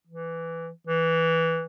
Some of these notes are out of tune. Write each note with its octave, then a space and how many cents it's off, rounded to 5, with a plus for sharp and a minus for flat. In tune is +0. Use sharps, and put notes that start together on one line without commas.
E3 +10
E3 -5